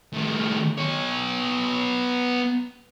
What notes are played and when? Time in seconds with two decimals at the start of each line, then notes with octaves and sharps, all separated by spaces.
0.14 A2 D#3
0.78 B3 C#5